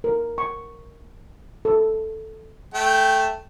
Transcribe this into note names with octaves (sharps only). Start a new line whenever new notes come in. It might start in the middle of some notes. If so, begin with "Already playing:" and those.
A#4
C#6
A4
A3 G5